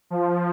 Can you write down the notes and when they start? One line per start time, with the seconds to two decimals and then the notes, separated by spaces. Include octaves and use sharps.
0.10 F3